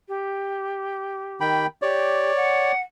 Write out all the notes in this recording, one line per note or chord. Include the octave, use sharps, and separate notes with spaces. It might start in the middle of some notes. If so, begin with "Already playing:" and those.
G4
D#3 G5 B5
G4 C#5 D5
F#5